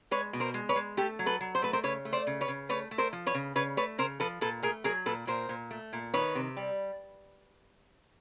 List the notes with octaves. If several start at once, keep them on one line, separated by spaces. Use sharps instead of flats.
G#3 B4 C#5
B2
A#4 C5
G#3
B4 C#5
G#3
A3 G4 A4
F#3
A4 B4
F#3
C5
A3 B4
A#4 C5
C#3 B4 C#5
A3
C5 D5
C#3
B4 C#5
C#3
A3 B4 C#5
A3
A#4 C5
F3
B4 C#5
C#3
C#3 B4 C#5
A3 B4 C#5
C#3 A#4 C5
F3 A4 B4
A#2 A4 B4
A3 G#4 A#4
F#3 G#4 A#4
A#2 A4 B4
A#2 A#4 C5
A#2
A3
A#2
D#3 B4 C#5
C3
G3